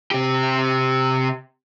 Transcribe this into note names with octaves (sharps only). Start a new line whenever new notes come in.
C3 G4